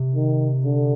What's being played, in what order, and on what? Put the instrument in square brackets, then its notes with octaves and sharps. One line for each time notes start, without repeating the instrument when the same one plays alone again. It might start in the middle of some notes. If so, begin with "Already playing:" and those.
Already playing: [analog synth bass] C3
[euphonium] D#3
D3